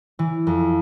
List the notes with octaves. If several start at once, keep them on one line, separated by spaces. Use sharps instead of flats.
E3
F2